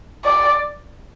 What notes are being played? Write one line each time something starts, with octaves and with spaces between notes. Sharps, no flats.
D5